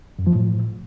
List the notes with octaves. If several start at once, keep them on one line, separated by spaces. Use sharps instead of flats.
F#2
F3
A2